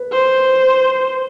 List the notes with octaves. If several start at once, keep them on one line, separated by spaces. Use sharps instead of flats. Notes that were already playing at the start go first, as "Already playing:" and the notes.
Already playing: B4
C5